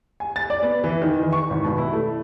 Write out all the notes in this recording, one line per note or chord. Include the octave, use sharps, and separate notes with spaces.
G#5
A6
D5
B3
E3
D#3
E3
C#6
G#1
B2
E4
A3